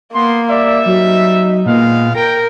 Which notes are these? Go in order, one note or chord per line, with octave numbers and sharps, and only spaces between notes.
A#3 B3 C6
G3 D5 E5
F#3 D#4
A#2 G#3 B3 F5
A#4 G5 A#6